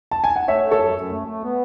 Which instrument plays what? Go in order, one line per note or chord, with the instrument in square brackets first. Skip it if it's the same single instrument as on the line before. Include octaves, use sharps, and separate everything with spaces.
[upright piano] A5
G#5
F#5
[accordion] A3 [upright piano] C#5 E5
[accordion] A3
[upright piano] A4 C#5
[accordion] F#2
F#2
A3
A3
B3